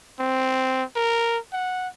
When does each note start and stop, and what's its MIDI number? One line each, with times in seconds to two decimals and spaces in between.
0.19 0.83 60
0.96 1.37 70
1.53 1.88 78